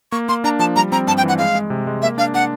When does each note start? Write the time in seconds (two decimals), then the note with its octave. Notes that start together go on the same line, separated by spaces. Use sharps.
0.12 A#3 C#6
0.29 A#3 C6
0.44 D4 A#5
0.59 F3 A5
0.76 G3 A#5
0.92 C4 A#5
1.07 G2 A5
1.17 G5
1.23 E3
1.29 F#5
1.38 G#3 F5
1.55 G#3
1.70 C3
1.87 G#3
2.02 A#3 E5
2.18 D4 F5
2.34 D4 F#5